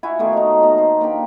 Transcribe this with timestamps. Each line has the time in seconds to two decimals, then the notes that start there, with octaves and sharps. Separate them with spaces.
0.03 E4 F#4 F5 G#5
0.19 B2 D#3 A3 C6
0.33 D#4 C#5
0.63 B2 A#5
0.78 C5
1.01 A#3 D4 G4